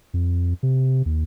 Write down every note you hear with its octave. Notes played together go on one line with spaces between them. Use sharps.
F2
C3
D#2